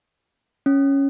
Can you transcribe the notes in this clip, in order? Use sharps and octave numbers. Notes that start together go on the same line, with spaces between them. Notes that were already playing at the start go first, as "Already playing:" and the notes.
C#4